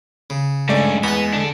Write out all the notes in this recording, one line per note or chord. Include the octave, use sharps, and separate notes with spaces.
C#3
G2 G#3 A3 C#4 D5
E2 B3 F#5 B5
D3 D4